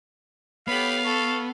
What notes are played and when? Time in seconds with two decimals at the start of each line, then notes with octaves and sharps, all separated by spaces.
0.68 B3 G4 A4 C#5 F5 B5
1.04 A4 C#6